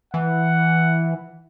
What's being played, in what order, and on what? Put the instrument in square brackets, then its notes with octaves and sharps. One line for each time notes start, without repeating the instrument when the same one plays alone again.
[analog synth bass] E3 [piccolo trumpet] F#5